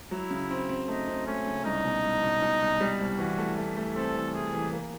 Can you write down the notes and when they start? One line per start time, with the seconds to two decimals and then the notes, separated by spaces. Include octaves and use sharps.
0.11 F#3 E4
0.31 C#3
0.51 C4
0.69 C4
0.88 A3 D#4
1.07 C4
1.27 A3 C#4
1.47 C#3
1.65 C2 D#4
1.85 B2
2.04 C2
2.23 B2
2.42 B2
2.61 C2
2.80 G3
3.00 C2
3.19 E3 F#4
3.38 A3
3.57 A3
3.77 A3
3.95 C4 A4
4.15 E3
4.34 C3 G#4
4.54 E3
4.72 A#3